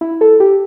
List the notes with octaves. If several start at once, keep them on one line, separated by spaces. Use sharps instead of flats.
E4
A4
G4